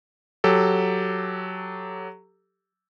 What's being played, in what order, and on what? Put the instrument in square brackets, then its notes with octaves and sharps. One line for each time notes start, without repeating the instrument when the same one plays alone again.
[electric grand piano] F#3 G4 A4